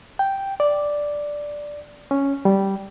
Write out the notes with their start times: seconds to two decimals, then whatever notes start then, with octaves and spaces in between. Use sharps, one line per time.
0.19 G5
0.60 D5
2.11 C#4
2.45 G3